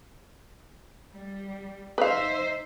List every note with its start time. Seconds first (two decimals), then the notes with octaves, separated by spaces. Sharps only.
1.13 G3
1.98 D#4 B4 C5 E5 F5